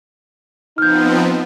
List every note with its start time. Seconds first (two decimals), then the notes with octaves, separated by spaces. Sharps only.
0.78 F3 B3 C4 D#4 F6 G6